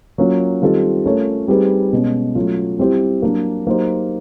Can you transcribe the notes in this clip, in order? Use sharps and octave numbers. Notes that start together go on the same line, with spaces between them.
F#3 A#3 C#4 F4
D#3 G3 C4 F4 A4
A3 C#4 F4 A#4 C#5
G3 C4 D#4 G#4 B4
B2 G#3 C#4
F#3 A3 C#4 F4
G3 C4 E4 G4 C5
F#3 A#3 D4
F#3 A#3 D#4 G4 C5